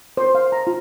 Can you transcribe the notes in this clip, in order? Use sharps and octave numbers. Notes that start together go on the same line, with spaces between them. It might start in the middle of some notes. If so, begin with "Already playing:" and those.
C5
F5
A#5
F4